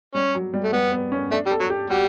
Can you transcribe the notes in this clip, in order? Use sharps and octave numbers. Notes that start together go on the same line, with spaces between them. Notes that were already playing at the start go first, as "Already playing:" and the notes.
G3 C#4
F#3
G3
A3
G3 B3
B3
C#4
A3 D4
G3
A4
F#3
G4
G3 F#4